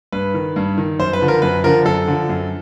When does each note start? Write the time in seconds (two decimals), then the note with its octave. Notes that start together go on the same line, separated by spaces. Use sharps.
0.12 G2 B4
0.34 D#3
0.56 G2
0.78 D#3
0.99 F#2 C5
1.13 B4
1.21 D3 F3
1.28 A#4
1.42 F#2 B4
1.64 D3 F3 A#4
1.85 F#2 A4
2.08 D3 F3
2.29 F#2